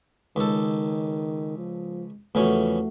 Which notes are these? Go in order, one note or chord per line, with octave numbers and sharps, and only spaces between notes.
C#2 D#3 A4
F3
E2 C#3 F3 A3 C#4 F#4